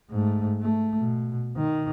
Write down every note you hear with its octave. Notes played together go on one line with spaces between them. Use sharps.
G#2 A3
A3
B2
D#3